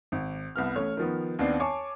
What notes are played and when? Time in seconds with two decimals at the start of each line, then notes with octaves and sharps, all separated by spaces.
0.12 G#1
0.56 C2 B3 F6
0.76 A1 A3 C#5
0.97 D#3 F3 B3
1.39 D#2 B3 C4 D4 D5 C7
1.60 C#5 G#5 A5 C#6 D6